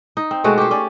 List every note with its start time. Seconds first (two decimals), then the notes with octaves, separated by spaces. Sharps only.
0.17 D#4
0.31 C4
0.44 B2 G#3 A3 F#4
0.58 G4 C5
0.71 C#4 D5